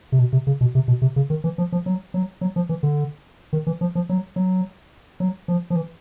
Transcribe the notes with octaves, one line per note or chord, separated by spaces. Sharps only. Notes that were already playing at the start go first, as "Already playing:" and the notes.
C3
B2
C3
C#3
B2
C3
B2
C3
C#3
D#3
E3
F3
F3
F#3
F#3
F#3
F3
E3
D3
D#3
E3
F3
F3
F#3
F#3
F#3
F3
F3
E3